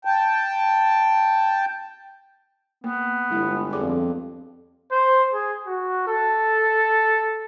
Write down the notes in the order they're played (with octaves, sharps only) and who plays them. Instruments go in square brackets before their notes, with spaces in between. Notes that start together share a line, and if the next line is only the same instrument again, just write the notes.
[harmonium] G5 A5
[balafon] A#3 [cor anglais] B3
[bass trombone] G1 [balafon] G3 G#3 E4
[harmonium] F2 [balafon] G#4 D5 D6
[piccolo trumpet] C5
G#4
F#4
A4